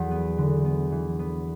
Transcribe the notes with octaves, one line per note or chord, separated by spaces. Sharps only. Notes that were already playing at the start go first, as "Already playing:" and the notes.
Already playing: E2 F#3
B3
D3
B3
E3
B3